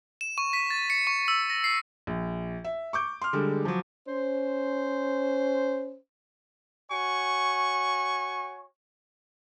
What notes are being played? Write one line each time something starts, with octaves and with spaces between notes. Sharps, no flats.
E7
C#6
B6
A6
C#7
C#6
E6
A#6
C7
A#1
E5
C#6 D6 G6
C6 F6
D3 G3 G#3
F3 F#3
C#4 C5
F#4 C#5 G#5 C#6